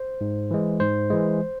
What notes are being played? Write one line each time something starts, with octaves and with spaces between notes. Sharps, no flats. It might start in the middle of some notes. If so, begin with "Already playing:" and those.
Already playing: C5
G#2
E3 G#3
G#2 C5
E3 G#3